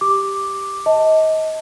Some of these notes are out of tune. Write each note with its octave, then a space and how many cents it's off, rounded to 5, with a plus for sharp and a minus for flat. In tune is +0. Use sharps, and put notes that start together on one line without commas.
G4 +0 D6 +0
D#5 +25 A5 +15